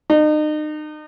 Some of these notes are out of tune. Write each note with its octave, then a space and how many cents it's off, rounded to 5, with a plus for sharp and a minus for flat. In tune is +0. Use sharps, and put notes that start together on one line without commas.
D#4 -35